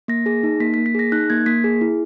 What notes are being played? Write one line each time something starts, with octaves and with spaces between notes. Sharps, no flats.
A#3 A#6
G#4 A#6
D#4
A#3 B6
B6
A#3
B6
G#4 A#6
D#4 F#6
A#3 G#6
A#3 B6
G#4
E4